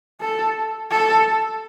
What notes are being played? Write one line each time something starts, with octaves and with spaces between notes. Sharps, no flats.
A4
A4